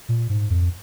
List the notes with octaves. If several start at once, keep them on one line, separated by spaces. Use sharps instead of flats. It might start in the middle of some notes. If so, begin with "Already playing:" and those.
A#2
G#2
F2